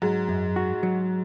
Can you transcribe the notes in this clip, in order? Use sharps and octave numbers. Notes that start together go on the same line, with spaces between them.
G#2 F#3
F#2
F#4
F#3